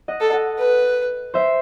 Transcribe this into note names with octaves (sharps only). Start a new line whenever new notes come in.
D#5 F#5
A4
D#5 F#5
B4
C5 E5